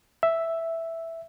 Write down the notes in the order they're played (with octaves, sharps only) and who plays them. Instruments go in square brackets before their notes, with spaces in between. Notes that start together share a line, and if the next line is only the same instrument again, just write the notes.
[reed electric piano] E5